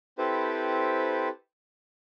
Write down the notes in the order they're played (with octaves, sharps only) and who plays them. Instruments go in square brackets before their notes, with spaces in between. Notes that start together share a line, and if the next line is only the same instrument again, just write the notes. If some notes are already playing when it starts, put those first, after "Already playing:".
[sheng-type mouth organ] C4 E4 G4 A4 B4 C5